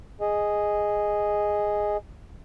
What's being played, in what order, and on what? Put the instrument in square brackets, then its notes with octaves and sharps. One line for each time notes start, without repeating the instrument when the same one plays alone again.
[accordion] G#4 D#5